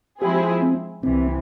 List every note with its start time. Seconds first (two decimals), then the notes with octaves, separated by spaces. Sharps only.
0.22 F3 G#3 C4 E4 G4 G#4
0.62 C4
1.03 C2 C3 E3 C4